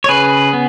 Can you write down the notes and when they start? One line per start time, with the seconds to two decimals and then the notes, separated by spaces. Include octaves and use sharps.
0.04 C#5
0.08 C#3 G#4 B4
0.53 B3